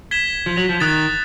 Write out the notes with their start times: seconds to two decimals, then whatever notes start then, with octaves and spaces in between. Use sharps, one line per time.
0.11 G#6 B6 E7 G7
0.46 F3
0.57 F#3
0.69 F3
0.80 D#3 D#6 F#6 A6